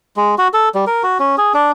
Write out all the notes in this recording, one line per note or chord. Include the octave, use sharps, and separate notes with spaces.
G#3
F#4
A4
G3
A#4
F#4
C#4
G#4
D4